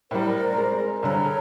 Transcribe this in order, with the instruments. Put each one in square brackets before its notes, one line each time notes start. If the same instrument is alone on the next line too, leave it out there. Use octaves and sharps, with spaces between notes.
[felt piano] A2 G3 [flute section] A#4 C5 D5
[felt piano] G#3 C4
[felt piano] G2 D3 B5 [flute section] A4 C#5 A#5